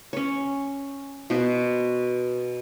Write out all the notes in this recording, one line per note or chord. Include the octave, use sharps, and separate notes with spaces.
C#4 C#5
B2 B3 F#4 C5